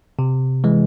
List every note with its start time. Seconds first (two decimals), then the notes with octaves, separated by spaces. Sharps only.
0.19 C3
0.64 E3 G#3